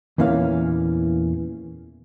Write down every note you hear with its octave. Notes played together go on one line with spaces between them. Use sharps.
E2 A#2 E3 C#4 F5